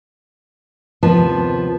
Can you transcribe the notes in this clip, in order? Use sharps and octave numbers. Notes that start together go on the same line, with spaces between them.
D#2 C3 F3 B3 A5